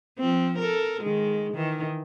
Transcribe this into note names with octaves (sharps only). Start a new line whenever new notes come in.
F3 C4
A4 A#4
D#3 G#3
D#3 E3